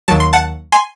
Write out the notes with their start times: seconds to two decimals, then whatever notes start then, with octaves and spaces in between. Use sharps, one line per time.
0.08 D#2 D#3 F#3 A5
0.20 C6
0.33 F#5 A5
0.72 G#5 C6